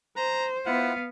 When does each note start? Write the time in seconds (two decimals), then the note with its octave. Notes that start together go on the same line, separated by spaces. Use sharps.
0.17 C5 A#5
0.66 B3 E4 F4 F5 F#5